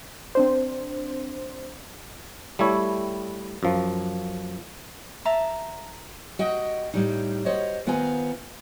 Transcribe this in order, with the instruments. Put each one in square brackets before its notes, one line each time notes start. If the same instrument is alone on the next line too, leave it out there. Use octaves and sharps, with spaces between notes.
[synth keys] C4 D4 C5
[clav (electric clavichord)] G3 A3 E4 C#5
F#2 F3
[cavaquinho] E5 A5 A#5
[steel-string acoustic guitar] F#4 D#5 G5
A2 G3 D#4
F#4 C5 C#5 D#5
D#3 B3 F4 C5 G#5 A#5